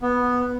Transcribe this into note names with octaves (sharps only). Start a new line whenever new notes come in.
B3